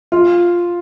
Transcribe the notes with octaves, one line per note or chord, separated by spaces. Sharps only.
F4